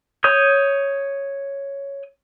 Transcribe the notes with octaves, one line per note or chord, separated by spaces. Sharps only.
C#5 D#6 G6